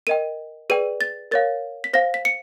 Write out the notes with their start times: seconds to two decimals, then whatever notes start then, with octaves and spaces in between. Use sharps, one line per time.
0.07 A#4 D#5 G5 D#7
0.70 G#4 B4 D5 G5 D#7
1.01 A6
1.31 A#4 C#5 F5 A6
1.84 B6
1.93 C5 F5 A#6
2.14 B6
2.25 C#7